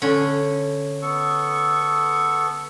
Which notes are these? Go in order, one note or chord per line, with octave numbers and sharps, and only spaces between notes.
D3 C#4
B3 A4 C#6